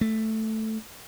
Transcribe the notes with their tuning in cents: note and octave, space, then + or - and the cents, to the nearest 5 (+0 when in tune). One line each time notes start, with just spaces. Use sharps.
A3 +0